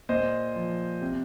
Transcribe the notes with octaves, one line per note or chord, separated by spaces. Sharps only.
A#2 C5 D#5
F3
C3